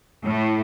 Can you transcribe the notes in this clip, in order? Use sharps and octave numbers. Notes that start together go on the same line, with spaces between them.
A2